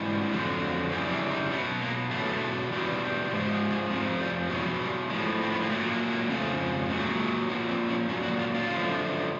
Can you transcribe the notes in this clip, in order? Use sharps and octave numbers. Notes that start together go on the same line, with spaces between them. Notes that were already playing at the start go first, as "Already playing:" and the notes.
Already playing: G#2 E3 G3
F2 D3 F#3
F#2 C#3 E3 G3 C#4
D4
D#4
B2 F#3 B3
A#3
E2 B2 F#3 A3
E2 B2 G3
G#2 F3 G#3
G#3
G#3
F2 C3 F3 G#3
G3
E2 B2 F#3 G#3
G3
A2 F3 G#3
C4
B3
A#3
A#2 F#3 A3
A#3
A#3
F2 C#3 F3 A3
A#2 F#3 G#3
A3
G#3
G#3
A#2 F3 B3
C4
C#4
A#2 F#3 C#4
F#4
F4
F4
F#2 D3 F3